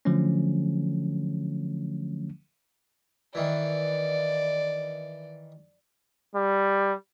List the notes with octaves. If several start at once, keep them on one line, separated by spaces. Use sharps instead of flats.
D3 F3 F#3 A3 C#4
D#3 E3 D5
G3